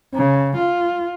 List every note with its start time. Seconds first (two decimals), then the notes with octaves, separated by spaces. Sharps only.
0.15 C#3
0.57 F4